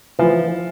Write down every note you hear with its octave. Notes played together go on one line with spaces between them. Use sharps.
E3 F3